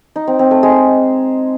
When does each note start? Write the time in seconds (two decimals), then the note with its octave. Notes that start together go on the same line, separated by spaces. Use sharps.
0.16 D#4
0.27 C4
0.39 C4
0.51 A3
0.63 G#3